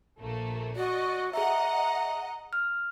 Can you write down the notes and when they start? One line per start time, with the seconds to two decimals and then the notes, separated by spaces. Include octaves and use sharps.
0.18 A#1 A3 A#3
0.76 F#4 D5 D#5 C#6
1.34 G#4 D#5 E5 F#5 A#5
2.53 F6